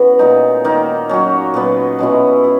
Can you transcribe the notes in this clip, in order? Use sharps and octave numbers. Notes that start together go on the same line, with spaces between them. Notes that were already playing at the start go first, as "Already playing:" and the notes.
Already playing: E3 B3 C#4 F#4 G#4
A#2 G#3 D#4
D#3 A#3 D#4
F#3 C#4 F#4
A#2 F#3 B3
B2 G#3 C#4 E4
E4 G#4